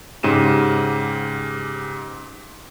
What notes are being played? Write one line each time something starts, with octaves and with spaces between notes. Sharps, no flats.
G#2 C#3 G4 D#7 E7